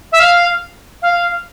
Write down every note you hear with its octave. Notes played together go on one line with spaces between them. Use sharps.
E5
F5
F5